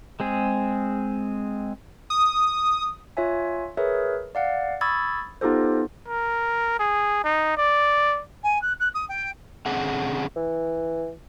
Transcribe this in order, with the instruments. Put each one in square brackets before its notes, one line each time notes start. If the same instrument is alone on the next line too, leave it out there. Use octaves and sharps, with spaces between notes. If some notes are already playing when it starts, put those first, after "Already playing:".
[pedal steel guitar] G#3 C4 G#4
[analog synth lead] D#6
[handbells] F4 C#5 E5 G#5
G#4 A#4 B4 C#5 E5
D5 F5 F#5
B5 C#6 D#6 E6 G#6 A6
B3 D#4 F4 G4 A4 C5
[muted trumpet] A#4
G#4
D#4
D5
[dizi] G#5
F#6
F#6
D#6
G5
[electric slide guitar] D3 C4 C#4 G#4 F#5
[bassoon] E3